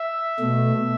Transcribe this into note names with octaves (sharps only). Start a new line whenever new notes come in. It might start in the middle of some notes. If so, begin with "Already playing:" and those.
Already playing: E5
B2 A3